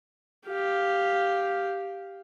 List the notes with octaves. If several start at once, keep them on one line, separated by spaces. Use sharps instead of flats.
G4 F5